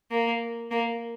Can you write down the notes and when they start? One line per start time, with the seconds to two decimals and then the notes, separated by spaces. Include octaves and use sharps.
0.11 A#3
0.71 A#3